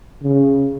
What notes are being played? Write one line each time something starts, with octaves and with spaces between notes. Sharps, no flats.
C#3